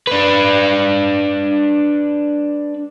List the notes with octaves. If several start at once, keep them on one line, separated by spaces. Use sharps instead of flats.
D4 B4